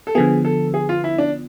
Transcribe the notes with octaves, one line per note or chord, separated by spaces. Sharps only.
A4
D3 F3 B3 G#4
A4
G#4
F4
E4
D4